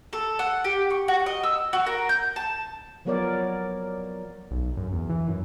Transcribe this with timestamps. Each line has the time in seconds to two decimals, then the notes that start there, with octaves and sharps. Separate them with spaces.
0.13 A4
0.39 F#5
0.65 G4
0.90 C#6
1.08 F#4
1.26 D#5
1.43 E6
1.73 F#4
1.87 A#4
2.09 G6
2.36 A5
3.05 F3 F#3 B3 A#4 C#5 D5
4.51 B1
4.77 F#2
4.92 E2
5.10 E3
5.28 F#2